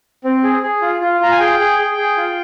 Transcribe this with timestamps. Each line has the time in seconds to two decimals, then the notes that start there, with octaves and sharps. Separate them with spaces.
0.24 C4
0.43 G#4
0.62 G#4
0.82 F4
1.01 F4
1.20 F4 A#5
1.32 G#5
1.40 G#4 G5
1.59 G#4
1.79 G#4
1.98 G#4
2.17 F4